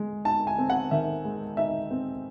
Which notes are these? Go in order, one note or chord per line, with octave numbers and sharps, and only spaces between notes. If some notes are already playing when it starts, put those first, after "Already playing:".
Already playing: G#3
D#4 A5
G#5
C4
F#5
D#3 E5
G#3
D#4 E5
C4